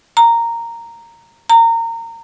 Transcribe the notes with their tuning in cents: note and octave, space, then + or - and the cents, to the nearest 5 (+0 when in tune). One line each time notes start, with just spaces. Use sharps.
A#5 -10
A#5 -25